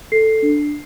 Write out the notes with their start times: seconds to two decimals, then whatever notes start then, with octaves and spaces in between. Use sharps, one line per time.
0.12 A4 C7
0.42 D4